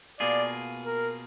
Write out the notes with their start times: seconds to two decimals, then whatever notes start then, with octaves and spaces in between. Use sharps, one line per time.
0.20 B2 A#3 F4 G#4 D5
0.86 A#4